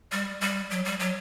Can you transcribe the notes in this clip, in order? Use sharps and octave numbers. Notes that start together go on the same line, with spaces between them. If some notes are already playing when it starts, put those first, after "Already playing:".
G3
G3
F#3
G3
F#3